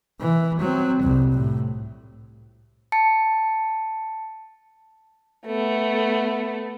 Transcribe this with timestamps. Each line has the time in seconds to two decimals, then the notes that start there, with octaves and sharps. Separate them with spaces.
0.20 E3
0.59 F#3 C4
1.02 C2 F2
1.32 A2
2.92 A5 C#7
5.46 A3 B3